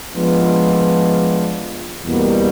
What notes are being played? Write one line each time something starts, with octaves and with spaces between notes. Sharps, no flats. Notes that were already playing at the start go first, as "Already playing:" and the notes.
F3 G#3 B3 D4 F4
E2 B2 G3 A#3